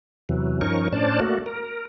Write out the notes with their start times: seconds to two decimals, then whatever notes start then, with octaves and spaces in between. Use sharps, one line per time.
0.29 E2 C3 E3 F#3
0.61 G2 F3 C#4 D#4 A#4 C#6
0.92 A2 C#4 D4 C5 D5 A5
1.20 A3 A#3 F#4
1.46 A#4